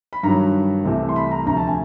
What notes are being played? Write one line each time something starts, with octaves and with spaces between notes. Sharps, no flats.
B5
G2 D#3 F#3 A#5
C2 C3 E3 A3
C6
B5
A#5
D2 C3 F3 A#5
A5
G#5